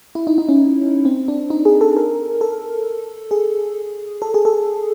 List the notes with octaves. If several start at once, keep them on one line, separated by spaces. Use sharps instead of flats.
E4
D#4
D#4
C#4
C4
D4
D#4
G#4
A4
A#4
A4
G#4
A4
G#4
A4